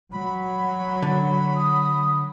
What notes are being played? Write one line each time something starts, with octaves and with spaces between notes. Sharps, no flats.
F#3 B5
D3
D#6